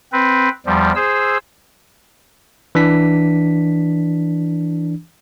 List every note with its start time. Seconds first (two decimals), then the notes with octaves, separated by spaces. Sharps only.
0.12 C4 B4
0.66 E2 F3 G3
0.95 G#4 C5 E6
2.75 E3 D4 B6